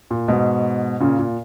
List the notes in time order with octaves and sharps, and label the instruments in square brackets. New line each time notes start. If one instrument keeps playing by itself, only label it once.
[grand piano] A#2
G#2 B2
A#2 C#3
A#2